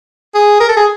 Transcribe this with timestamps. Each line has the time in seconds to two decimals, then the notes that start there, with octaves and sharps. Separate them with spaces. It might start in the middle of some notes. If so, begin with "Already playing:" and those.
0.35 G#4
0.60 A#4
0.69 A4
0.77 G#4